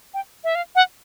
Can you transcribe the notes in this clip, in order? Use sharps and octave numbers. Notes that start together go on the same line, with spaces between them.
G5
E5
F5
F#5